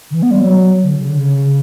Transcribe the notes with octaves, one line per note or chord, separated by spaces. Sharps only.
D3
E3
B3
G3
F#3
D3
C#3
D3
C#3